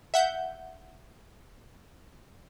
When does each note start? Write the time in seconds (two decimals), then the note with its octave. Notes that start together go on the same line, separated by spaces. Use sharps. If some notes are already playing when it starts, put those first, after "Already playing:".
0.14 E5 F#5 G6